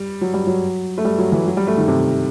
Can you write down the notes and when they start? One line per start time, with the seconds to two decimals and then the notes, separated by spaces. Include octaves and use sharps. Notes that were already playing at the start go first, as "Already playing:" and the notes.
Already playing: G3
0.21 F#3
0.34 G3
0.47 F#3
0.98 A3
1.05 G3
1.18 F#3
1.32 E3
1.46 F#3
1.57 G3
1.67 A3
1.78 D#3
1.88 C3